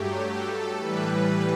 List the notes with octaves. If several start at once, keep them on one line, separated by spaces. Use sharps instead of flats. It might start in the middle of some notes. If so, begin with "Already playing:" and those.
Already playing: G2 F#3 A3 G4
A4
A2 E3 G3 B4
B4